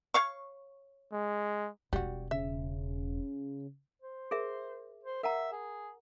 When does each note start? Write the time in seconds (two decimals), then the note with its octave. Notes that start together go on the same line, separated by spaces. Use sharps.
0.14 C#5 F5 C#6
1.13 G#3
1.93 E1 G3 F#4
2.31 C#3 E5
4.02 C5
4.31 G#4 A#4 E5
5.03 C5
5.23 A#4 E5 F#5 A#5
5.52 G#4